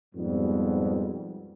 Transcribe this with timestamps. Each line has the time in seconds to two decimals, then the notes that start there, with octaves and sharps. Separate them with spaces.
0.14 F2 G#2 B2 G3 B3